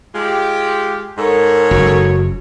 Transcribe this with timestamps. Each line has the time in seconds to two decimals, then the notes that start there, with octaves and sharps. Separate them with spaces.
0.15 G#3 F4 G4
1.18 G#2 A4 A#4 C#5
1.71 F#1 F#4